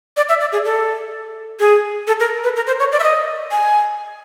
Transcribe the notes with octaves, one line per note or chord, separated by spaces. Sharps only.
D5
E5
D5
G#4
A4
G#4
A4
A#4
B4
A#4
C5
C#5
D5
E5
D#5
G#5